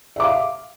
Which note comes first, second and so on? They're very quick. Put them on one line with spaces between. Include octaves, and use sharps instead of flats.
E5 D6 F5